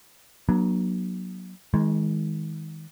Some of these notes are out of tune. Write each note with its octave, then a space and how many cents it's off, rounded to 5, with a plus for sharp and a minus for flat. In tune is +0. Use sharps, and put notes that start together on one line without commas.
F#3 +0 A#3 +40 D4 +30
D#3 +35 G#3 +0